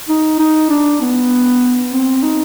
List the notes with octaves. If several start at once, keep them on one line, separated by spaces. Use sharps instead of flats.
D#4
D#4
D4
B3
C4
D#4